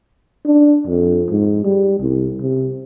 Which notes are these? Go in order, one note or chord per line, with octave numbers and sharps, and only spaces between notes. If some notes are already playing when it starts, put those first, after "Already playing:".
D4
F2
G#2
G3
C2
C3